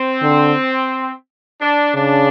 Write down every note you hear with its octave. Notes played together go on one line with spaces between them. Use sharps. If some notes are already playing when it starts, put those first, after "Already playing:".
Already playing: C4
D3
D4
C#3 D4